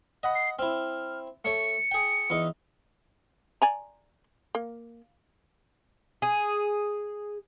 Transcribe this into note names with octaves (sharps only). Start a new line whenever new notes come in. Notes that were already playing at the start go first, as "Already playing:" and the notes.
D#5 F#5 B5
C7
C4 E4 F6
A3 C#5 C#6 C#7
G#4 G5
E2 D#4
D5 G#5 A#5
A#3
G#4